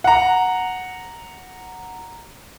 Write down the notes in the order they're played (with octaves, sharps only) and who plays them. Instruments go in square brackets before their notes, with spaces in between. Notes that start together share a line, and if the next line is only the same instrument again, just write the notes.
[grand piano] F#5 A#5